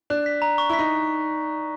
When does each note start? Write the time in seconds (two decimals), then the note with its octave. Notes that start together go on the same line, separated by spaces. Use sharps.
0.10 D4 F#6
0.26 B6
0.42 A#5
0.58 C#6
0.69 E4
0.73 B6
0.79 D#4